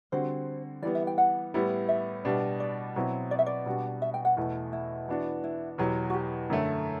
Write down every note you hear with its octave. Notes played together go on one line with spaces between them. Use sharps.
D3 G3 C4 F#4 C5
E3 G3 B3 D5
E5
G5
F#5
A2 G3 B3 E4
E5
B2 G3 B3 D4
D5
B2 F#3 C4 E4
D5
E5
D5
B2 G3 D4 F#4
E5
G5
F#5
E2 B2 A3
E4
E3 B3 D4 F#4
E4
E2 B2 F#3 G4
F#4
G4
F#2 D3 A3